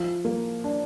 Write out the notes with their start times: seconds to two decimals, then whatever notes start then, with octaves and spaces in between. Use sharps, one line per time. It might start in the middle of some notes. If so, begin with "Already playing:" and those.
Already playing: F3
0.25 A#3
0.64 D4